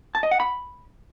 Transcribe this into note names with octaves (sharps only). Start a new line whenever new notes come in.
A5
D#5
F#5
B5